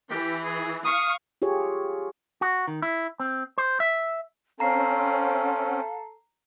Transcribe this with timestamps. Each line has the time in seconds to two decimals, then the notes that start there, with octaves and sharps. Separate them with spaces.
0.11 E3 G4
0.44 G#4
0.85 F5 C#6 D#6
1.42 F4 G4 G#4 C#5
2.41 F#4
2.68 D#3
2.82 E4
3.20 C4
3.58 C5
3.80 E5
4.60 C4 C#4 A4 F5 A#5 C7